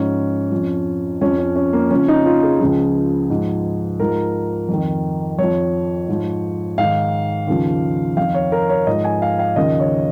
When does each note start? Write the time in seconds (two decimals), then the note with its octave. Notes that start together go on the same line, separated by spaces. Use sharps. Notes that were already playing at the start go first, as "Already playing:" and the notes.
Already playing: G#2 F3 C#4
0.51 F2 F3
1.21 F2 F3 C#4
1.39 C#4
1.56 C#4
1.73 A#3
1.91 F2 C#3 F3 C#4
2.08 D#4
2.26 F4
2.43 G#4
2.60 C#2 C#3 F3
3.30 G#2 F3
4.00 G#2 F3 A#4
4.69 F2 D#3
5.39 F2 F3 C#5
6.08 G#2 F3
6.78 G#2 D#3 F5
7.47 D#2 C#3 F3
8.17 F2 D#3 F5
8.35 C#5
8.52 A#4
8.69 C#5
8.86 G#2 F3 D#5
9.04 G#5
9.22 F5
9.39 F5
9.56 D#2 C#3 F3 D#5
9.80 C#5